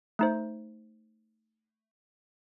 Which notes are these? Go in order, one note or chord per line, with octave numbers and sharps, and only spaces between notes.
A3 D#4 C5